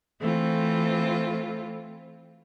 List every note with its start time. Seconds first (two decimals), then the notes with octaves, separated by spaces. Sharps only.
0.20 E3 A3 C4 F4